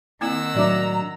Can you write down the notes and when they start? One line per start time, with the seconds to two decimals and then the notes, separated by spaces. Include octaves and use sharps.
0.21 D#3 A#3 C4 E4 F#5 E6
0.55 A2 F#3 D4 D5 E5 A#5 D6